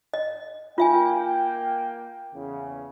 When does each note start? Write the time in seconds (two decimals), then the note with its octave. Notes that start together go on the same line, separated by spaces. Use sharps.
0.14 D#5
0.78 A#3 F4 E5 G5 G#5
2.34 E2 C#3